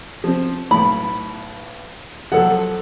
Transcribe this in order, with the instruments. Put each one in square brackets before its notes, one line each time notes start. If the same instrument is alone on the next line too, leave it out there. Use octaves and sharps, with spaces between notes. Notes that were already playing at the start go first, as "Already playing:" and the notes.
[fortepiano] F3 C4
[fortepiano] B1 A2 [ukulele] B5
[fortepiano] F3 F#3 [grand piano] A4 F#5